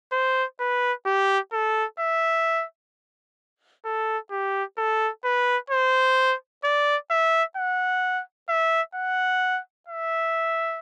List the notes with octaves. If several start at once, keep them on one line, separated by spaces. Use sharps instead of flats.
C5
B4
G4
A4
E5
A4
G4
A4
B4
C5
D5
E5
F#5
E5
F#5
E5